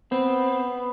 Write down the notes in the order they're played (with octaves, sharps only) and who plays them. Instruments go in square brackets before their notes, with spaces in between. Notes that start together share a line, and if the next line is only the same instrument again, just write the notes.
[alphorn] B3 [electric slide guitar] C4